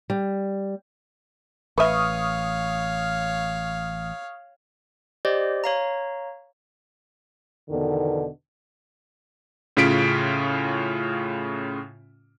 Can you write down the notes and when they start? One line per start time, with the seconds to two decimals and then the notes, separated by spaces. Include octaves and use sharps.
0.10 G3
1.78 A1 B4 C#5 E5 F5 C#6 D#6 F6
5.25 G4 C5 D5 D#5
5.64 C#5 F5 A#5
7.70 E2 B2 D3 D#3
9.77 A2 C#3 C#4 F4 B6 D7